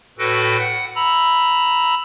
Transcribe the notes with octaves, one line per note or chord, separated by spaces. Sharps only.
A2 F#4 A4 B4 G5 A#6
F#5
A#5 B5 E6